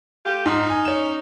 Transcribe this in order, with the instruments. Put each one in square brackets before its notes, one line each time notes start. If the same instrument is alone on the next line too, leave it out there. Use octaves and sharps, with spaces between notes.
[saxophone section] A3 F4 G4
[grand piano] G#2 F6 [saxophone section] D#4
[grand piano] G#5 F6
C#4 E7